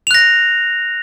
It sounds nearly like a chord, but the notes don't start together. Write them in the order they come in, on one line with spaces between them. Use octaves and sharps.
F7 F#6 A#6